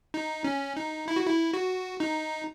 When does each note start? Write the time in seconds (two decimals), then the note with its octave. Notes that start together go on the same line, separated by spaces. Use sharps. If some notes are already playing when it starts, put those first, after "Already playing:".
0.14 D#4
0.44 C#4
0.77 D#4
1.08 E4
1.16 F#4
1.26 E4
1.53 F#4
2.00 D#4